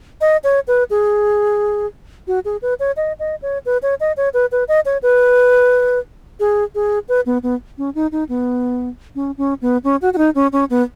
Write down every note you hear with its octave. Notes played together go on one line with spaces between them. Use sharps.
D#5
C#5
B4
G#4
F#4
G#4
B4
C#5
D#5
D#5
C#5
B4
C#5
D#5
C#5
B4
B4
D#5
C#5
B4
G#4
G#4
B4
B3
B3
C#4
D#4
D#4
B3
C#4
C#4
B3
C#4
F#4
F#4
D#4
C#4
C#4
B3